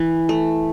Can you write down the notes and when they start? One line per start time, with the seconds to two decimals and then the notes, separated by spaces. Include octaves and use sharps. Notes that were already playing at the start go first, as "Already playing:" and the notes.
Already playing: E3
0.29 A3